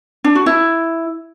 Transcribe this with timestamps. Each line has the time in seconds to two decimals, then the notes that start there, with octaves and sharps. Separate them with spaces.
0.24 D4
0.35 F#4
0.46 E4